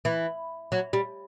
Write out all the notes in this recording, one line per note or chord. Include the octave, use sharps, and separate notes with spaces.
E3
F#3
G3